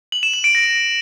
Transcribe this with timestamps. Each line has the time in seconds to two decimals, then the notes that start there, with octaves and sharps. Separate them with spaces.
0.12 F#7
0.23 E7
0.34 F#7
0.44 D7
0.55 A#6